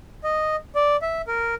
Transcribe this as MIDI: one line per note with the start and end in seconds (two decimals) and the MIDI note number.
0.24 0.56 75
0.75 0.97 74
1.02 1.22 76
1.27 1.55 70